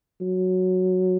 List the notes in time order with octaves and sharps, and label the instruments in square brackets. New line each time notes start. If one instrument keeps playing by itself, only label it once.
[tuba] F#3